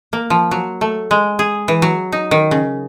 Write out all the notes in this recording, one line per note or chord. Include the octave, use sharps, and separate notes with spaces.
A#3
F3
F#3
A3
G#3
G#4
E3
F#3
D#4
D#3
C#3